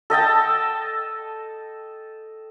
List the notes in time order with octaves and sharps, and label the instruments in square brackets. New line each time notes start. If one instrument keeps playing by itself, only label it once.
[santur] A4 D#5 G5 A5